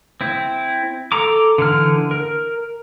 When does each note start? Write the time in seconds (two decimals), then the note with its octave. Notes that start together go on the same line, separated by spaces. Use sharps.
0.21 C4 E4
1.12 A4 A#5 D6
1.58 D3 E3 F6
2.11 A#4